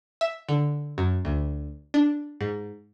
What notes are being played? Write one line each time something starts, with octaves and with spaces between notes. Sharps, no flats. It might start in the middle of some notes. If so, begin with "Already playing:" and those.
E5
D3
F#2
D2
D4
G#2